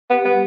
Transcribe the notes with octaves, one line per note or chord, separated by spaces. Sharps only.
B3 G4
G3 B3